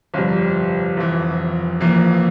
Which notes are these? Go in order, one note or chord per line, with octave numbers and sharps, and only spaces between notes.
G1 F2 C3 G3
F1 F2 E3
F1 F2 E3 A#3